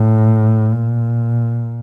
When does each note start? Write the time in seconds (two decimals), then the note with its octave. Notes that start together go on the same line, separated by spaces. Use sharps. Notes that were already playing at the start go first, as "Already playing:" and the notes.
Already playing: A2
0.72 A#2